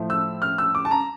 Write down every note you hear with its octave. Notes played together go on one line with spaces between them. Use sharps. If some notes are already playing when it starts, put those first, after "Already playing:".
Already playing: A2 F3 A3
E6
F6
E6
D6
A5
A#5